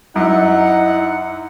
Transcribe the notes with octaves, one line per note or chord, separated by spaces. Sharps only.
F#2 D#4 E4 F#5